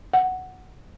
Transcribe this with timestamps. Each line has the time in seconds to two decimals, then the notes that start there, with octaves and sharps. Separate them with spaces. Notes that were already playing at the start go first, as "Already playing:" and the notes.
0.14 F#5